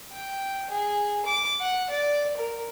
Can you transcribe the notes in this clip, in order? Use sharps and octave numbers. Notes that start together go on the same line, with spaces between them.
G5
G#4
D6
F#5
D5
A#4